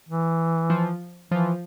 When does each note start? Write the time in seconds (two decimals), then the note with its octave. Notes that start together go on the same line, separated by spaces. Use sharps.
0.08 E3
0.70 F3
1.31 E3 F3